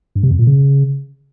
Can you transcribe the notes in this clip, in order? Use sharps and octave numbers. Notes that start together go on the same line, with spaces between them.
G2
C3
F2
A#2
C#3